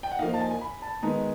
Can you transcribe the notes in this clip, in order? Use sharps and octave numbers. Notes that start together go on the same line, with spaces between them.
G5
F#5
F3 A#3 D#4 F5
A5
G#5
G#5
B5
A5
D#3 G#3 B3 D#4 A#5